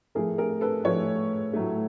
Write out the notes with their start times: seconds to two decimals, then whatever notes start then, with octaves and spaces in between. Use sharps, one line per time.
0.15 A2 F3 A3 G#4 A#4
0.38 G#4 A#4
0.61 A4 B4
0.84 A2 F3 A3 B4 C#5
1.53 A2 F#3 A3